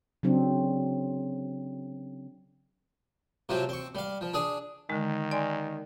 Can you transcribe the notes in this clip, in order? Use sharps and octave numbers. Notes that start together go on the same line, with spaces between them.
C#3 F#3 C4 D4
C3 F3 F#3 C4
C4 C#6
G3 F5
F3
D4 G#4 D#6
D3 D#3 G#3
D5 G#5 C6